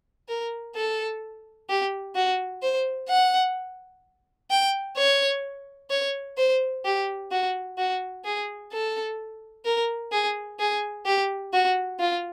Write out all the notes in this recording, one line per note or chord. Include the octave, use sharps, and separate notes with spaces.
A#4
A4
G4
F#4
C5
F#5
G5
C#5
C#5
C5
G4
F#4
F#4
G#4
A4
A#4
G#4
G#4
G4
F#4
F4